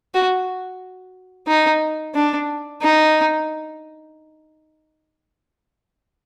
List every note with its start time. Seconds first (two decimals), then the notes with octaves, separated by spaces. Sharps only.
0.14 F#4
1.48 D#4
2.15 D4
2.82 D#4